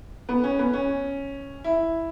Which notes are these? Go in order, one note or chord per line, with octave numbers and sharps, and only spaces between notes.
B3
C#4
B3
C#4
E4